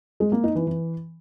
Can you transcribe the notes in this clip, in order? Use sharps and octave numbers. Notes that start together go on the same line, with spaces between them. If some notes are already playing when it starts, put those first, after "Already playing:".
G#3
A#3
D#4
E3
E3